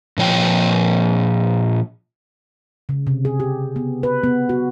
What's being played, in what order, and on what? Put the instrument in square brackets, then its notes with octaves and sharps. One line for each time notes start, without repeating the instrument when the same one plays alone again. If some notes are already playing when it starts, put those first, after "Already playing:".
[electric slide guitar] A#2 F3 C#5 G5
[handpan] C#3
C3
G#4
G4
B3
B4
B3
F#4